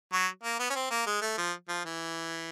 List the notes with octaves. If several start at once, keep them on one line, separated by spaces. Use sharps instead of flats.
F#3
A#3
B3
C#4
C4
A#3
G#3
A3
F3
F3
E3